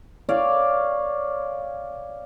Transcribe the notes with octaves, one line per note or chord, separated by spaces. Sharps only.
C#5 D5 F5